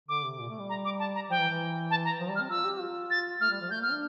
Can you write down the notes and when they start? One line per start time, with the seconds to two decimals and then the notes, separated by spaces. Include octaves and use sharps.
0.09 D3 D6
0.24 C3
0.39 A#2
0.49 A3
0.59 G3
0.69 A#5
0.85 D6
0.99 A5
1.15 A#5
1.30 F3 G5
1.39 E3
1.49 E3
1.90 A5
2.05 A#5
2.20 F3
2.30 G3
2.36 F6
2.41 C4
2.50 F4 E6
2.65 G4
2.81 F4
3.10 A6
3.41 A3 F6
3.51 G3
3.61 F3
3.70 A3 G6
3.81 A#3 F6
3.91 D4